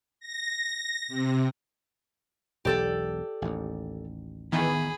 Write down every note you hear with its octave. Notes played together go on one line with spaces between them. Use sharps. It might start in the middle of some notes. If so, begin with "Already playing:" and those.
A#6
C3
E1 B1 G4 A4 D5
A1 D#2
D#3 E3 B3 G#4 B5